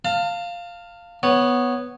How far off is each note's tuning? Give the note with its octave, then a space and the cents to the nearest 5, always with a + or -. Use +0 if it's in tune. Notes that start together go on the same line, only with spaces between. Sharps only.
F5 +0 A5 +35
B3 +0 C#5 -5